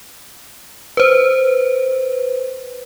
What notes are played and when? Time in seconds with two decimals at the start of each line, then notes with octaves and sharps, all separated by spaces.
0.97 B4 C5